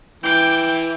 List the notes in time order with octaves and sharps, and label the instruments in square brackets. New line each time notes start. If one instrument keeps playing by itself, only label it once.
[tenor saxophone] E3 [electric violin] G5 D6